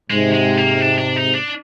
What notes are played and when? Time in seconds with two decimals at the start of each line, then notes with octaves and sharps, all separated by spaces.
0.10 G#2 C3 G#3
0.33 G#3
0.57 A#3
0.81 D4
0.98 D4
1.16 D#4
1.34 D4